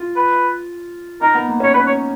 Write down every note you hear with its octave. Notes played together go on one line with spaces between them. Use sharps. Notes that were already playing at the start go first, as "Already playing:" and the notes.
Already playing: F4
B4
D#4 A#4
B3
A#3
C#4 C#5
C#4 B4
C#5